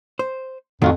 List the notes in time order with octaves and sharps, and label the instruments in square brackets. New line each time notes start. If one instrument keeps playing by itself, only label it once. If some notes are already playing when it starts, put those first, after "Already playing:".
[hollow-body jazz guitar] C5
[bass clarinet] F2 [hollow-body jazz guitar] A2 D#3 A3 [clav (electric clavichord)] F#3 F4 F#4